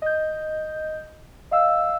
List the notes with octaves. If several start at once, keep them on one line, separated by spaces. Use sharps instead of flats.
D#5 G6
D#5 F5 E6